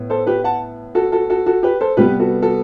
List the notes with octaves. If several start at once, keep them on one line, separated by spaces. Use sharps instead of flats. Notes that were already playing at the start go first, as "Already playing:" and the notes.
Already playing: A2 B3
A4 C5
G4 B4
F#5 A5
F#4 A4
F#4 A4
F#4 A4
F#4 A4
G4 B4
A4 C5
C3 G3 B3 G4 B4
F#4 A4
F#4 A4